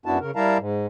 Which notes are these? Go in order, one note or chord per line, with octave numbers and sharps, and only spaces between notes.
F#2 B3 D4 E4 F#4 A5
C#3 A#4
G3 E4 A#4 F5 A5 A#5
G#2